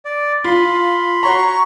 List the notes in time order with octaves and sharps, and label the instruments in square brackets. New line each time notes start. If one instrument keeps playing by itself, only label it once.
[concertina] D5
[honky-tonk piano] F4 [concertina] B5 C6
[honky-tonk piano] F#4 C#5 A#5 [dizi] C#6